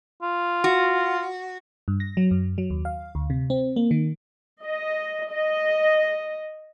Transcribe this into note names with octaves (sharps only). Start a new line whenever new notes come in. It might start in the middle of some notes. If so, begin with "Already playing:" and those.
F4
F#4
G2
A#6
F#3
F#2
F#3
D#2
F5
D2
C3
C4
A#3
D#3
D#5
D#5